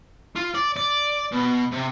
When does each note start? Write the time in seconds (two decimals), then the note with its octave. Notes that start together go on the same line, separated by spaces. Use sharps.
0.36 F4
0.55 D5
0.77 D5
1.32 B2
1.72 C3